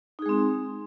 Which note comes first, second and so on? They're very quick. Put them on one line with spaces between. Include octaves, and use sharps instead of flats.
D#4 G#4 G#3 C4